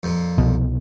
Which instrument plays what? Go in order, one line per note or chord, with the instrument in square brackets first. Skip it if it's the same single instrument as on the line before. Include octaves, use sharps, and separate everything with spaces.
[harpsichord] F2 A#2
[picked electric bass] C2 B2